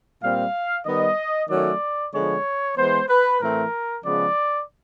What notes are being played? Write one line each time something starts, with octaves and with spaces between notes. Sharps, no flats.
A#2 G3 C4 F5
D#3 G3 B3 D#5
D#3 F#3 A3 C#4 D5
D3 F3 G#3 B3 C#5
E3 G#3 B3 C5
B4
A2 E3 A3 C4 A#4
C#3 F3 G#3 B3 D5